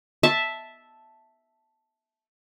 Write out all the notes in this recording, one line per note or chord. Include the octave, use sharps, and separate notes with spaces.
E5 A5